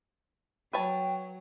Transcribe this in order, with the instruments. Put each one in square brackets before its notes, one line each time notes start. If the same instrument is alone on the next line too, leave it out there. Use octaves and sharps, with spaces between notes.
[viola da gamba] F#3 [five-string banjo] B4 C#5 A5 [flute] G5